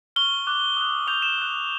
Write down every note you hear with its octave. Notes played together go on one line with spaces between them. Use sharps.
C#6 F6 G7
D6 F#6
D#6 F#6
D6 G6 F7
E7
D#6 F#6